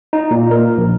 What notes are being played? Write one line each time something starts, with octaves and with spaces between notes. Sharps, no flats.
D#4
A#2
A#4
A#1